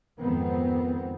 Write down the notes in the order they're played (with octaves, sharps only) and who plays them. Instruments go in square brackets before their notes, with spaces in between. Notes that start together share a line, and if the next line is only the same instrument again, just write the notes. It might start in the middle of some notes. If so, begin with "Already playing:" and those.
[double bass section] F2 G#2 D#3 B3 C4